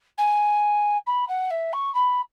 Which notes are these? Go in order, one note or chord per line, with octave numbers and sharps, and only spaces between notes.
G#5
B5
F#5
E5
C#6
B5